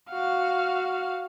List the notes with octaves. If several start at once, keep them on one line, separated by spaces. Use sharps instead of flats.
F#4 F5